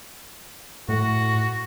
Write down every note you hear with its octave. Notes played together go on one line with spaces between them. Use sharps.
A2 F#4